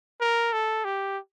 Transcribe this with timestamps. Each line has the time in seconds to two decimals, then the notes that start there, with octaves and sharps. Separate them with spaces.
0.21 A#4
0.53 A4
0.85 G4